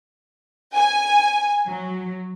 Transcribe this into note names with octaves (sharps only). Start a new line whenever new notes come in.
G#5
F#3